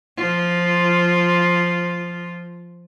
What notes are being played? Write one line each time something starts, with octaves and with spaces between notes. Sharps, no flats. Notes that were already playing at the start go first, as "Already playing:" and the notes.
F3 F4